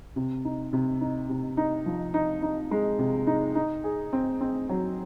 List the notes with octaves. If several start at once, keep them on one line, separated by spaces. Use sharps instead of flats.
C3
D#4
C3
D#4
C3
D#4
F3
D#4
D#4
G#3
C3
D#4
D#4
G#4
C4
C4
F#3